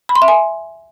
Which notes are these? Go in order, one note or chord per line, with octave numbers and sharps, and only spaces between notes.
B5
C6
E5
G#5